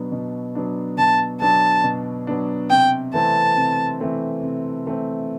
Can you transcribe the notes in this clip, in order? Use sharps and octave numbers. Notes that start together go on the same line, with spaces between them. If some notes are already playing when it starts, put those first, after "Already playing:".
Already playing: B2 F#3 B3 D4
B2
F#3 B3 D4
B2 A5
F#3 B3 D4 A5
B2
F#3 B3 D4
C3 G5
E3 A3 C4 A5
C3
E3 A3 C4
C3
E3 A3 C4